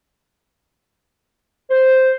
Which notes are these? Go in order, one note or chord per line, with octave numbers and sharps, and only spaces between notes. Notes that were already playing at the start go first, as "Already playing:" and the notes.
C5